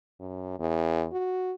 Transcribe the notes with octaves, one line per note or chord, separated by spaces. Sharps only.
F#2
E2
F#4